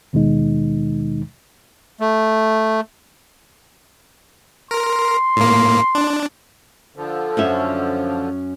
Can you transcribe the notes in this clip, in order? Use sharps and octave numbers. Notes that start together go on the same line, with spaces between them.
D#2 B2 D#3 G#3 D#4
A3
A#4 C6
A2 A#3
D4
D3 F3
F#2 C#4 E5